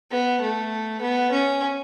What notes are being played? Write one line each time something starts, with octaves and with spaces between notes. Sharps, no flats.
B3
A3
B3
C#4